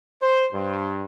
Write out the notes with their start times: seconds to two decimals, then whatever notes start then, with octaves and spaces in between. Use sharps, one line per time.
0.22 C5
0.53 G2